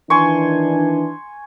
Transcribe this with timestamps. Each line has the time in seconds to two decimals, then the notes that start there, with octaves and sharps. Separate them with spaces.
0.10 D#3 E3 D4 G#5 C6 C#6